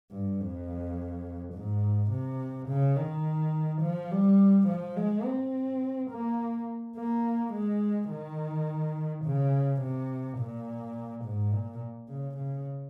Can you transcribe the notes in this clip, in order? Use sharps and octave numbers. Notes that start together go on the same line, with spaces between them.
G2
F2
G#2
C3
C#3
D#3
F3
G3
F3
G#3
C4
A#3
A#3
G#3
D#3
C#3
C3
A#2
G#2
A#2
C#3
C#3